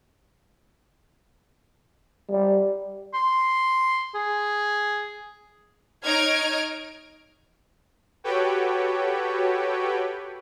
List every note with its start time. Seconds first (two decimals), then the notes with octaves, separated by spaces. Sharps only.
2.31 G3
3.14 C6
4.15 G#4
6.05 D#4 C#5 D#5 F6 G#6 D7
8.24 F#4 G4 A4 B4 C#5 G5